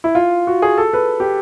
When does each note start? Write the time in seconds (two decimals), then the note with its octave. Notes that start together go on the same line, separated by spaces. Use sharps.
0.04 E4
0.15 F4
0.47 F#4
0.62 G#4
0.78 A4
0.93 B4
1.20 G4